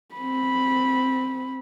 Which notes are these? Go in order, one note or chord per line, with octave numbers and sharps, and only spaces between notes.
C4 B5